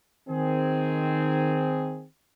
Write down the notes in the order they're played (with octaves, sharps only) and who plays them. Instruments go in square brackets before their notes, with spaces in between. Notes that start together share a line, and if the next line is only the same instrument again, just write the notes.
[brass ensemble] D#3 C4 G#4